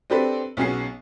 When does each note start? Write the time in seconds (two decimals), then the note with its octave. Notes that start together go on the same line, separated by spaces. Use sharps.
0.10 C4 D4 G4 A4 B4
0.57 B1 B3 C#4 F#4 G#4 C7